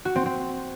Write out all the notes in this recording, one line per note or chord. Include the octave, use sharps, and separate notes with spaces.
F#4
C4
C4